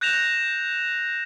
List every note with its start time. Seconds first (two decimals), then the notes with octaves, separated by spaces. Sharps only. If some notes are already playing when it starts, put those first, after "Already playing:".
0.01 F#6 G6 A#6 E7 F7